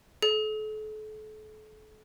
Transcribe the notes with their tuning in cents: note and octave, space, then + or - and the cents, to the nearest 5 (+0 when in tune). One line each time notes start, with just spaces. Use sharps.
A4 -35